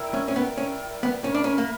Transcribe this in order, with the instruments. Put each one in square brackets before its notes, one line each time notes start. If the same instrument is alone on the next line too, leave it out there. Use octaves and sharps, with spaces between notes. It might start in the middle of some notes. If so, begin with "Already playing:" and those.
Already playing: [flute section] E4 A#4 D5 G5
[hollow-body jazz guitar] C#4
C#4
[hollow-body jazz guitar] B3 [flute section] E4 A#4 D5 G5
[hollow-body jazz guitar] C#4
B3
[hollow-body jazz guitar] C#4 [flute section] A#4 E5 B5
[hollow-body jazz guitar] D4
C#4
A#3